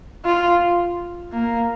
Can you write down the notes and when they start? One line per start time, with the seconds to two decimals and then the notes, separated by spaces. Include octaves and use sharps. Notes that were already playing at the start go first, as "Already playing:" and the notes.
0.25 F4
1.33 A#3